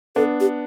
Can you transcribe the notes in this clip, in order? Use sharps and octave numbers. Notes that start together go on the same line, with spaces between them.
B3 D4 A4
G4